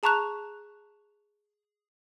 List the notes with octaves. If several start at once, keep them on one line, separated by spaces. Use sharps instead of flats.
G#4 A5 A#5 C#6 F#6 F7